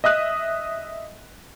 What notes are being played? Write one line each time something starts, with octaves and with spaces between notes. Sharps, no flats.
D#5 E5 D#6 F#6